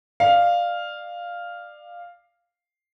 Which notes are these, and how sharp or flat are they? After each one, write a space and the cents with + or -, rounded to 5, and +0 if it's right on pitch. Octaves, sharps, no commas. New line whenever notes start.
D5 +25 F5 +0